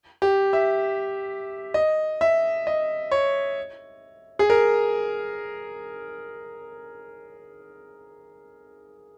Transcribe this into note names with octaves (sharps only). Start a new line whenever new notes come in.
G4
E5
D#5
E5
D#5
C#5
G#4
A#4